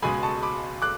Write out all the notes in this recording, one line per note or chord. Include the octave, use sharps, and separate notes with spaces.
C#2 B2 G#3 G#5 B5
A5 C#6
B5 D6
D6 F#6